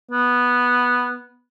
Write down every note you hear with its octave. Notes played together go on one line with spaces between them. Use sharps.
B3